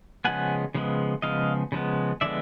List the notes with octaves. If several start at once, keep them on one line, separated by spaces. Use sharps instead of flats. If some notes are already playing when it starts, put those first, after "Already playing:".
C#3 F3 G#3 B3 F#5 G#5
C#3 F3 G#3 B3
C#3 F3 G#3 B3 D#5 F5
C#3 F3 G#3 B3
D3 F3 G#3 B3 D5 E5